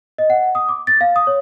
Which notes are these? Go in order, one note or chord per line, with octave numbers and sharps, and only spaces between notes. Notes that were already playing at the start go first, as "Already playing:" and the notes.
D#5
F#5
D#6
D6
A6
F5
D#6
C#5